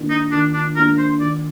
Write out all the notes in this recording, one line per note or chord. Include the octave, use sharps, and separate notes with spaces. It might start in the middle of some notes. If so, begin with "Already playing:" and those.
Already playing: D#3 A#3 D4 F4
D#4
D#3 D4
D4
A#3 D4 F4 A#4
C5
D#3 D5